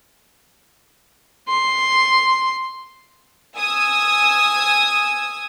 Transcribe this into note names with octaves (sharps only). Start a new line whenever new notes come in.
C6
G#5 D#6 E6